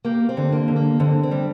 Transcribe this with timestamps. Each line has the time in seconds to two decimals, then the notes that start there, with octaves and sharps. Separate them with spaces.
0.05 A#3 G4
0.29 C4
0.37 D3
0.52 A#3
0.68 D3
0.76 A#3
1.00 D3 C4
1.23 C4
1.31 G3